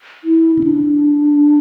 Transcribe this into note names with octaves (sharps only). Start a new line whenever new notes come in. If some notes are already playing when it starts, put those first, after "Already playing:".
E4
C#4
D4